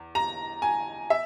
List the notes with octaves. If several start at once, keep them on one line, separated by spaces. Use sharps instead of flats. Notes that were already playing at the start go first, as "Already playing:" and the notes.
Already playing: E2
A#5
G#5
E5